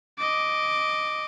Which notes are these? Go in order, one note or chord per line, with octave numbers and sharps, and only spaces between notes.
D#5 D6